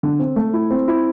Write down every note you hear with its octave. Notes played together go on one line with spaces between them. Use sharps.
D3
C4
A3
E4
C4
E4